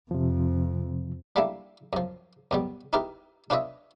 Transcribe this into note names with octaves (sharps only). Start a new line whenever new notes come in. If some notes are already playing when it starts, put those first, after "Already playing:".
F2 C3 F3
G3 A3 A#3 D4 E4
F#2 F3
F#2 B2 G3
D#4 E4 G4 A#4 B4
D4 F4 B4 C#5 D#5 E5